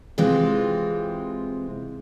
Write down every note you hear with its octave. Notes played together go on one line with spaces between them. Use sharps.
C3 E3 G#3 C4 F4